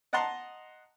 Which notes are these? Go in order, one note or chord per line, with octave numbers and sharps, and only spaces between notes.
D#5 F#5 A5 A#5 C6